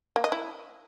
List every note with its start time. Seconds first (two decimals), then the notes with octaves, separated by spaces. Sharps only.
0.16 A#3
0.24 D#5
0.32 E4